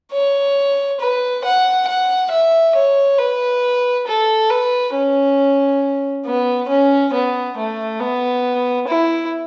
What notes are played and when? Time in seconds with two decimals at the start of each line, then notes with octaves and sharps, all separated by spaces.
0.13 C#5
1.01 B4
1.45 F#5
1.87 F#5
2.31 E5
2.76 C#5
3.19 B4
4.07 A4
4.50 B4
4.94 C#4
6.26 B3
6.69 C#4
7.13 B3
7.58 A3
8.00 B3
8.88 E4